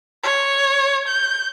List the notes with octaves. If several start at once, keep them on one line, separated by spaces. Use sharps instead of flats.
C#5
G6